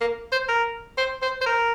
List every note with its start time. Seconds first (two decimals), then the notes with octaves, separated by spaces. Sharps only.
0.01 A#3
0.32 C5
0.49 A#4
0.98 C5
1.22 C5
1.41 C5
1.46 A#4